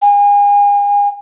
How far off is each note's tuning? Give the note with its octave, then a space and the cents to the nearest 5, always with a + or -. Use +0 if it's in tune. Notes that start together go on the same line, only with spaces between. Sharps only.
G#5 -35